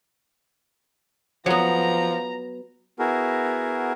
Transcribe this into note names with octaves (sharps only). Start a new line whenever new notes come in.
F3 F#3 B3 A#5
B3 E4 F#4 G#4 A#4